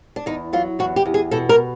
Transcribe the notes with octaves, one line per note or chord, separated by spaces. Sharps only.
D4
E2 D#4
F#3 F4
E2 F#4
G4
E2
G#4
B2 A4
A#4